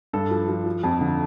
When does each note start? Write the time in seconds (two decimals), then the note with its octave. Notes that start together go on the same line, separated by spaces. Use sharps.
0.13 G2 A4
0.31 F3
0.49 F3
0.66 F3
0.84 F2
1.01 D3